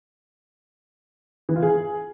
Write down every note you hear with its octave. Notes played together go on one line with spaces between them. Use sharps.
E3
F4
G#4